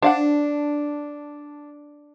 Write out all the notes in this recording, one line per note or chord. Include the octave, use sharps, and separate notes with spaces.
D4 C5 F5 F#5